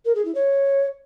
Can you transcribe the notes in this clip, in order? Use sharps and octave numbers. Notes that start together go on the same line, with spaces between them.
A#4
G#4
E4
C#5